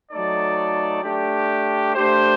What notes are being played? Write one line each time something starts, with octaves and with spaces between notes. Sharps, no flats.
F#3 A3 D#4 A4 D5
A3 D4 G4
A3 D4 G4 C5